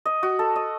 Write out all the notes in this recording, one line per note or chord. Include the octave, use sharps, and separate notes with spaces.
D#5
F#4
A4
D#5